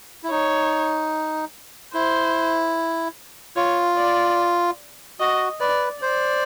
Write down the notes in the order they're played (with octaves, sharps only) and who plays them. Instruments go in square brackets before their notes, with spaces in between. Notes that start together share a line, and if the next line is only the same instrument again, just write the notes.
[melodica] E4
[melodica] D#4 [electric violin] C#5
[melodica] E4 [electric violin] C5
[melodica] F4 [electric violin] C#5
[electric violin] D5
[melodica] F#4 [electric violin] D#5
[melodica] B4 [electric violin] D5
[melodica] C5 [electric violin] D5